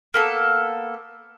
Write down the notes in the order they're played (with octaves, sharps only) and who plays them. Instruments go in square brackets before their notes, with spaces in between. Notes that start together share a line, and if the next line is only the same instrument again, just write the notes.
[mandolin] A#3 B3 A4